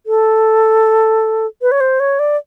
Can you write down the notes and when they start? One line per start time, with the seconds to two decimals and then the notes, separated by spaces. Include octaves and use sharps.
0.06 A4
1.62 B4
1.72 C#5
1.80 C5
2.00 C#5
2.19 D5